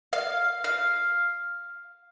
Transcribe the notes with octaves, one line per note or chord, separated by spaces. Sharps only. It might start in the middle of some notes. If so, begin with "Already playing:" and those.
F5
F5